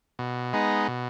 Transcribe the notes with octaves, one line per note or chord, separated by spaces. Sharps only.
B2
G#3 B3 D#4
B2